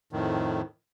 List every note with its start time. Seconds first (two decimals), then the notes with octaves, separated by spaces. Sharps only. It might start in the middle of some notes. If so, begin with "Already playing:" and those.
0.13 F2 A2 D#3